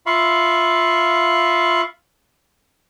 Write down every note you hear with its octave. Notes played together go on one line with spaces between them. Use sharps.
F4 E5 F5 B5 C#6